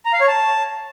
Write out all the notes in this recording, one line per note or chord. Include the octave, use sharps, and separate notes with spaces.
A#5
F5
C#5
A5